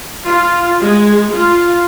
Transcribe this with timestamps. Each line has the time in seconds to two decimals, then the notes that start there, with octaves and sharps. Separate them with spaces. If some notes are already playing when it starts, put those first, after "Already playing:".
0.24 F4
0.80 G#3
1.32 F4